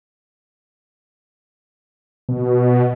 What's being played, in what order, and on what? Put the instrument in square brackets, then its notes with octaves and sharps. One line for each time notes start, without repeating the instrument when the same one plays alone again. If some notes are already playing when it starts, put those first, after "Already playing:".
[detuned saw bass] B2